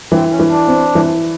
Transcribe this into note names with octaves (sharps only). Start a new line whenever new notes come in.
E3 C4
C#4
E3
D4
C4
E3